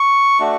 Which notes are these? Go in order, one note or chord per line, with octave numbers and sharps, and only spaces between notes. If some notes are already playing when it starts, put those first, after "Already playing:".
Already playing: C#6
A3 D4 F#4